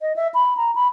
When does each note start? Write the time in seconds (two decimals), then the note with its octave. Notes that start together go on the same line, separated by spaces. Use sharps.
0.02 D#5
0.16 E5
0.34 B5
0.57 A#5
0.75 B5